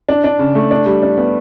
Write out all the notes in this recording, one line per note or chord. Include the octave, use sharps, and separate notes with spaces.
D4
D4
C#3
A3
D4
G3
D4
B3